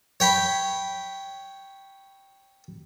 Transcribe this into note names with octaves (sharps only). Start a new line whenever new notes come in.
C#5 G5 B5